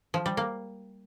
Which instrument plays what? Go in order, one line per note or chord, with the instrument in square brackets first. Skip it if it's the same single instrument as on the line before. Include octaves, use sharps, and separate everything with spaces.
[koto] F3
G3
A#3